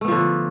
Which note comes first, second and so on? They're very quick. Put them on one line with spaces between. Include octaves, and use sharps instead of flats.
A3 B3 F3 D3